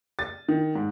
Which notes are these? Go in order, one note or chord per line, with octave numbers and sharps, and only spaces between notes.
A6
D#3
G#2